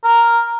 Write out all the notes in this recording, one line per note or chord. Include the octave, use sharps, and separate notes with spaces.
A#4